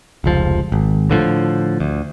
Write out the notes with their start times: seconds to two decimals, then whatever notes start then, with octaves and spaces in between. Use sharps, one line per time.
0.24 F1 C#2 F3
0.72 G#1
1.10 A2 D3 E3 F3
1.80 D2